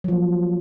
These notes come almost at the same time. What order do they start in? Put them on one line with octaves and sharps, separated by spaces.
F#3 F3 A#3